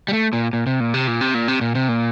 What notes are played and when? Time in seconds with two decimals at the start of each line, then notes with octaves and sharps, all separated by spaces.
0.08 G3
0.13 A3
0.33 A#2
0.53 A#2
0.66 C3
0.80 A#2
0.94 C3
1.07 A#2
1.21 C3
1.34 A#2
1.48 C3
1.61 A#2
1.75 C3
1.88 A#2